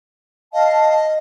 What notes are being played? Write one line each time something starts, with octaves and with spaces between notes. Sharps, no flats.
D#5 F5 A5